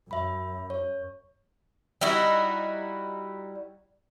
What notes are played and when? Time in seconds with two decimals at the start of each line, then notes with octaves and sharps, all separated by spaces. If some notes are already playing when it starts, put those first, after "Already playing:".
0.11 F#2 E5 B5
0.70 C#5
2.01 G3 D#4 E4 F#4